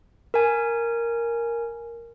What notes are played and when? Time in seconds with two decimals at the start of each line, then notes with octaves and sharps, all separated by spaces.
0.34 A#4 G#5